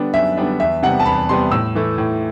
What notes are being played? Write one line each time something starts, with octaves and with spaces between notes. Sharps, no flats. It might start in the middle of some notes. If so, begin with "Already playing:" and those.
Already playing: D3 G3 B3 D4
F#2 E5
D3 G3 B3 D4
E2 E5
C3 G3 B3 F#5
A5
E2 B5
C3 G3 B3 C6
A2 E6
E3 A3 E4
A2